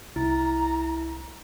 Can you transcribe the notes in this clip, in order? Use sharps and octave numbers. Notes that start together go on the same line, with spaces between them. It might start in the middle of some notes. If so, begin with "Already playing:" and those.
C2 E4 A#5